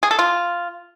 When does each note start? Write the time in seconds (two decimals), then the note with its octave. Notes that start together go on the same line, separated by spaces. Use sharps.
0.03 G#4
0.11 A4
0.19 F4